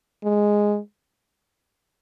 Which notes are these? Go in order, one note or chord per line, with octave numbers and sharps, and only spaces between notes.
G#3